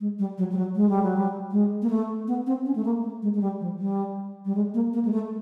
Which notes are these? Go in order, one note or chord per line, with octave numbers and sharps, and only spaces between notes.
G#3
G3
F#3
G3
F#3
G#3
G3
F#3
G3
G#3
A#3
A3
B3
C4
C#4
A3
A#3
A3
G#3
G#3
G3
F3
G3
G3
G#3
A#3
A#3
G#3
A3